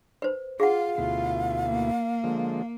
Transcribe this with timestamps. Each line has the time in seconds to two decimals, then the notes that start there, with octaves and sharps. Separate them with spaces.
0.22 B4 C5
0.60 F4 G#4 F5 F#5
0.98 D2 B2 E4 F4
1.67 A#3
2.24 D3 F3 G#3